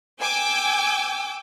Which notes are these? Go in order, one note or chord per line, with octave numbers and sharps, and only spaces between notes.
G5 G#5 D6 E6 G6